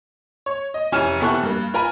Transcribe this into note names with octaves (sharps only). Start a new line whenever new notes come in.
C#5
D#5
F1 E3 C#4 G#5 F6 E7
C3 E3 B3 A4 C#6 F#6
G2 A#3
F4 A#4 G#5 B5